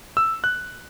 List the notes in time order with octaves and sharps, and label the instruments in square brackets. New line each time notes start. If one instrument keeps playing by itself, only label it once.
[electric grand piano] E6
F#6